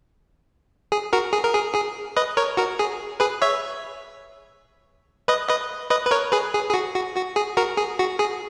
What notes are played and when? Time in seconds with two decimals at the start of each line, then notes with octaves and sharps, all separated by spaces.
0.92 G#4
1.13 F#4 A#4
1.33 G#4
1.44 A#4
1.54 G#4
1.75 G#4
2.17 B4 D#5
2.37 A#4 C#5
2.57 F#4 A#4
2.79 G#4
3.20 G#4 B4
3.42 C#5 E5
5.28 B4 D#5
5.49 B4 D#5
5.90 B4 D#5
6.06 B4
6.11 A#4 C#5
6.32 G#4 B4
6.54 G#4
6.69 G#4
6.74 F#4
6.95 F#4
7.16 F#4
7.36 G#4
7.57 F#4 A#4
7.77 G#4
7.99 F#4
8.19 G#4